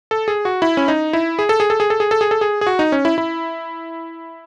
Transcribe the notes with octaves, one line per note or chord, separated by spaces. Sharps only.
A4
G#4
F#4
E4
C#4
D#4
E4
G#4
A4
G#4
A4
G#4
A4
G#4
A4
G#4
A4
G#4
G#4
F#4
D#4
C#4
E4
E4